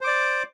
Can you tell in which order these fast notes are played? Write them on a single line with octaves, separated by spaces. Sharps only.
C5 D6 D5